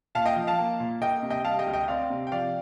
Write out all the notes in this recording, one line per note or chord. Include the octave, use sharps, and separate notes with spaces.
A#2 F5 A5
D#5 G5
F3
F5 A5
A#3
A#2
A#3 D#5 G5
C3
D#5 G5
G3 F5 A5
D#5 G5
D2
D#5 G5
C4 D5 F5
C3
G5
F3 D5 F5